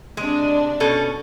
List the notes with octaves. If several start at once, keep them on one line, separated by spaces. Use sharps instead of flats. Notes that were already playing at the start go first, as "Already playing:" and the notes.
C3 G#3 D4
B2 C#4 A4